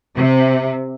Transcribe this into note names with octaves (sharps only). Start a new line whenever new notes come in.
C3